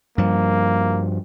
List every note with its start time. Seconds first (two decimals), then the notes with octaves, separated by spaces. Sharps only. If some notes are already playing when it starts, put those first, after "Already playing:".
0.18 G2 F3 A#3